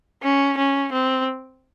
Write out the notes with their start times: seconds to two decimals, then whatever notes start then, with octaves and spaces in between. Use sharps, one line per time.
0.23 C#4
0.57 C#4
0.92 C4